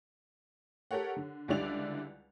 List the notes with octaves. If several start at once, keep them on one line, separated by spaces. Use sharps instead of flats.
G4 A4 A#4 C#5 F#5
D3
C#2 D3 G3 E4 D5 F7